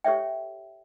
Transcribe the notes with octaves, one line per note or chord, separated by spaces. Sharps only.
G4 A4 C#5 E5 G5